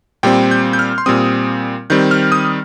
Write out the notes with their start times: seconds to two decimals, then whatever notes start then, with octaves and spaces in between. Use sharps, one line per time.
0.23 A#2 G3 C4 G5
0.51 G6
0.73 G6
0.79 F6
0.98 C6
1.06 A#2 G3 C4 D#6
1.90 D#3 G3 C4 G6
2.11 F6
2.32 D#6